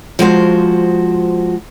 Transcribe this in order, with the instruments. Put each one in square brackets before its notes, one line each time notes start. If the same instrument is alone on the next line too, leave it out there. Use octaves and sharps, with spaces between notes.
[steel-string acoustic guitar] F3 G#3 F#4 C5